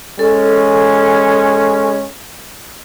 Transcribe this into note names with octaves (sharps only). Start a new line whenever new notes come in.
G#3 C#4 A4